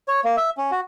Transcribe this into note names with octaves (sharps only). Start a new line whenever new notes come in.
C#5
A#3
E5
C#4
F#4